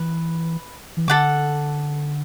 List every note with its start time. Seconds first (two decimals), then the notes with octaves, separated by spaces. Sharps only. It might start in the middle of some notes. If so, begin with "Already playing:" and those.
Already playing: E3 B4
0.97 E3
1.08 D3 A4 F#5 D6